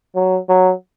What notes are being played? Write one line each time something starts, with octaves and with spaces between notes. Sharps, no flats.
F#3
F#3